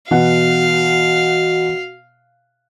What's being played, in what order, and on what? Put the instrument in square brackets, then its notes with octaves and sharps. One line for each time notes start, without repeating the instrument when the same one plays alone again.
[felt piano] B2 F#5 [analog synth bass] E3 [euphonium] F#4 [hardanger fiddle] F5